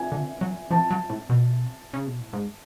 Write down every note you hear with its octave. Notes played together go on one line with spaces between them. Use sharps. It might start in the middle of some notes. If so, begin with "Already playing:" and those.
Already playing: G#5
D3
F#3
F3 A5
F#3
A2
B2
C#3
B2
A2
G#2